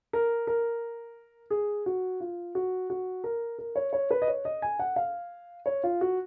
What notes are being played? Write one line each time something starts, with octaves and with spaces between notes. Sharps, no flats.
A#4
A#4
G#4
F#4
F4
F#4
F#4
A#4
A#4
C#5
C#5
B4
D#5
C#5
D#5
G#5
F#5
F5
C#5
F4
F#4